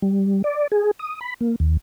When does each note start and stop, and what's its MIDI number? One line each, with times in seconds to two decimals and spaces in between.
0.02 0.42 55
0.44 0.67 74
0.72 0.91 68
0.99 1.19 87
1.21 1.34 83
1.41 1.56 58
1.60 1.77 39